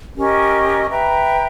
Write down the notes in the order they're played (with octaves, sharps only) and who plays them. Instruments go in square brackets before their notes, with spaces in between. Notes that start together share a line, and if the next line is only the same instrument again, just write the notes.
[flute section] C#4 G4 A#4 D#5
B4 E5 G5 A#5